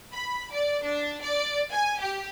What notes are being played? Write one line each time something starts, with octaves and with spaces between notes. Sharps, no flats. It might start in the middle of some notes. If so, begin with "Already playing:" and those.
B5
D5
D4
D5
G#5
G4